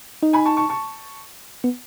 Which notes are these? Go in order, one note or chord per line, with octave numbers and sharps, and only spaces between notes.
D#4
G#5 B5
A5 C#6
A5 C#6
A5 C#6
B3